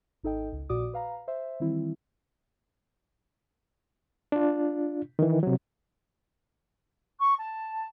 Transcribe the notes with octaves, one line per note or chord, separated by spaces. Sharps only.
G#1 D#4 A4 D#5 G5
C#2
A#1 A#2 F#4 D5 D6 D#6
B4 F5 A#5
C5 E5
D#3 E3 G3 C4 E4
D4 F4
D#3 E3
C3 F#3
C#6
A5